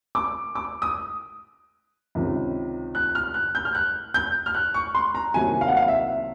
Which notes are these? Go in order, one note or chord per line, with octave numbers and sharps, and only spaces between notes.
D6
D6
D#6
C#2 C3 D#3
F#6
F6
F#6
G6
F6
F#6
G6
F6
F#6
C#6
C6
A#5
C2 C3 D#3 F#3 A#3 G#5
F5
F#5
F5
E5